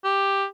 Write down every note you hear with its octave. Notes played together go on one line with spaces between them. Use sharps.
G4